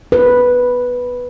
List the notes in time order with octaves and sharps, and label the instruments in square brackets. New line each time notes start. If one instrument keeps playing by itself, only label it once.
[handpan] B4